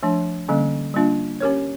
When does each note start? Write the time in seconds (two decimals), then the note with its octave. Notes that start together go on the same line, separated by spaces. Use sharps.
0.03 F3 A3 D4
0.49 D3 G3 A#3 C#4
0.94 G3 A#3 D4 F4
1.40 C#4 G4 A#4 C#5